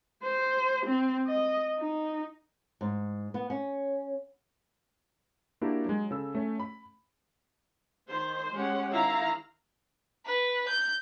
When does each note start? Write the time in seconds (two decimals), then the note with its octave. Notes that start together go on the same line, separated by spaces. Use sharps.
0.23 C5
0.86 C4
1.27 D#5
1.77 D#4
2.81 G#2
3.34 B3
3.50 C#4
5.61 A#3 D4 E4 F#4 G4 A#4
5.85 F#3 G#3
6.11 C#3 A4 E6
6.35 A3 C#4
6.60 B5
8.09 D#3 C5
8.52 G#3 C#4 G4 F#5
8.92 D#3 E4 F5 A#5
10.26 B4
10.68 G6